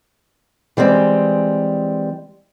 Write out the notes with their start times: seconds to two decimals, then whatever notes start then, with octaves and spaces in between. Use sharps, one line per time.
0.77 E3 G3 G#3 C4